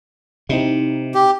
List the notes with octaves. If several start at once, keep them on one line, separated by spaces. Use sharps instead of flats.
C3 C4 D#4 E4
G4